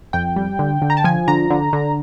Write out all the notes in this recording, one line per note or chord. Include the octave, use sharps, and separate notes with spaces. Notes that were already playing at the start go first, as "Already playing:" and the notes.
F2 G5
G3
D3
D3
A#5
A5
F3 G#5
D3 A#5
D3
D3